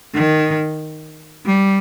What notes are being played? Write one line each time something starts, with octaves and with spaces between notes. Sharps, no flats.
D#3
G3